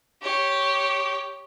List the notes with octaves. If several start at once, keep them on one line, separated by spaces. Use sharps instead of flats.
G4 C#5